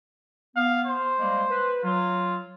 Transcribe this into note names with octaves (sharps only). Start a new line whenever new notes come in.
B3 F5
C5
G3 G#3 A#3
B4
F#3 F4